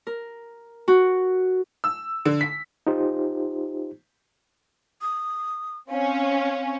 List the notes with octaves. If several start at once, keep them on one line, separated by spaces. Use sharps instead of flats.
A#4
F#4
E6
D3
B6
D#4 F4 G4 C5
D#6
C4 C#4 F5